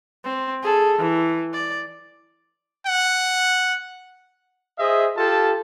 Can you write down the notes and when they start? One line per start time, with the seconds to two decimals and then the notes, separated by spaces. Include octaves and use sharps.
0.24 C4
0.63 G#4 A4
0.99 E3
1.53 D5
2.86 F#5
4.79 G#4 C5 D#5 E5
5.17 F4 G4 A4 A5